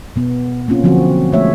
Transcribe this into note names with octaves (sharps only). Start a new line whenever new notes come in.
B2 B3
A#3 C4 C#4 F4
D3 F3 F#3 C4 F#4
G#3 A3 B3 C#5 E5